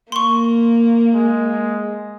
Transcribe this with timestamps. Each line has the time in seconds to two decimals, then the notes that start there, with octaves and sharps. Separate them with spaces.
0.12 A#3 C6 C#6
1.14 G#3